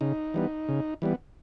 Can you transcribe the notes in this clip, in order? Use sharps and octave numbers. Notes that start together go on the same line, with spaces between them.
C#3 D#4
E3 G3 B3
C#3
E3 G3 B3